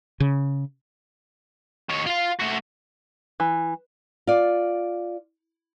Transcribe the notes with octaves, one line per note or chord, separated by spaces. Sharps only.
C#3
D#3 C#5
F4 F5
A3 F#4
E3
F4 D5